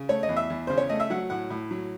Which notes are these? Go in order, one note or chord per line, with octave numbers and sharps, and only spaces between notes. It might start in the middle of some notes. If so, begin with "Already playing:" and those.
Already playing: C#3
A3 C#5
D#5
E2
E5
E2
C#3 C5
C#5
A3 D#5
E5
F#3 F#5
A2 F#5
A2
F#3